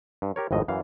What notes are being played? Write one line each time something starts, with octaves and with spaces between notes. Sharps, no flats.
G2
G4 A#4 C#5
G#1 F2 A2 D#5
F#2 E3 F5